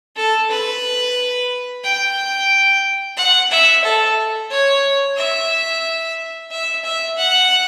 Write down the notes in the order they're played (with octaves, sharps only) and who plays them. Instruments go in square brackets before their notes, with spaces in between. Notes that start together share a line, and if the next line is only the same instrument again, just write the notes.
[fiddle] A4
B4
G5
F#5
E5
A4
C#5
E5
E5
E5
F#5